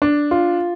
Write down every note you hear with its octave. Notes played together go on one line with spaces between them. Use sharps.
D4
F4